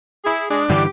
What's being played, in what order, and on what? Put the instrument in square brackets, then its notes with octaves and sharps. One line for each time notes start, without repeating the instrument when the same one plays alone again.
[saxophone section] E4 G#4
[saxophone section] G#3 G#4 [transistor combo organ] D4
[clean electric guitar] G2 D3 E3 [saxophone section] G4